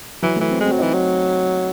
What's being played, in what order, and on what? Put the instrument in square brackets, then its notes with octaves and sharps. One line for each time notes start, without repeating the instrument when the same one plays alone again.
[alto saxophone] E3 [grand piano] F#3
[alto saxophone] E3 [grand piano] A3
[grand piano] C4
[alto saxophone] G#3 [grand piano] C4
[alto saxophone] F#3
[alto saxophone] E3 [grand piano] D#4
[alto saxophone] F#3